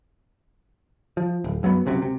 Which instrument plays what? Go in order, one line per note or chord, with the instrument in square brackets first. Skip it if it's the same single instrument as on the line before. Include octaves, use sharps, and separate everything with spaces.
[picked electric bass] F3
D1
F#2 F#3 G#3 B3
F#1 C#2 F#2 C3
C3